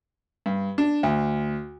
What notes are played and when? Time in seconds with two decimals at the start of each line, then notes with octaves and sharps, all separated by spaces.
0.46 G2
0.78 D4
1.03 D2